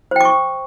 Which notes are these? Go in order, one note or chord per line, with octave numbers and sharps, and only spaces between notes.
C5 G5 C#6 D6